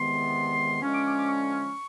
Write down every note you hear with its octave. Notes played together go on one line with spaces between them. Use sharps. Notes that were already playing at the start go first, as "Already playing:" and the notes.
Already playing: E2 C3 D#3 G#3 B3 C6
D3 F3 G#3 C#4
D6
D6
D6
C#6